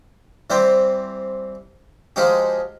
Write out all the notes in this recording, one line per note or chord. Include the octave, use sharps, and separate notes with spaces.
E3 G3 C4 C5
F3 G#3 D#4 F#4 G4